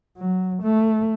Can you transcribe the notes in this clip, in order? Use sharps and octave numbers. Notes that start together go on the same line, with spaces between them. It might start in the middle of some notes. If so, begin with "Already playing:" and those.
F#3
A3